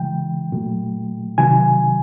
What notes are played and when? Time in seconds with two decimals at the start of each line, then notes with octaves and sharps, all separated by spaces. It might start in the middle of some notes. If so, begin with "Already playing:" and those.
Already playing: C#3 E3 G#3 G5
0.52 A#2 F#3 A3
1.38 C3 D#3 F#3 G#5